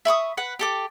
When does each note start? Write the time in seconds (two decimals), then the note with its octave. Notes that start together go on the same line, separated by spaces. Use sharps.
0.05 E5 B5 C#6 D#6
0.37 B4 F#5
0.59 G4 A4 D6